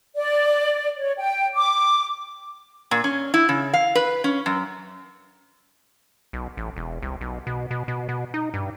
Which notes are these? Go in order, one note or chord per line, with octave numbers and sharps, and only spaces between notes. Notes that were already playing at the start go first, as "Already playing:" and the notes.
D5
C#5
G5
D6
A#2
C#4
E4
C#3
F5
B4
C#4
F#2
B1
A1
E1
C2
B1
B2
B2
B2
B2
D#4
G2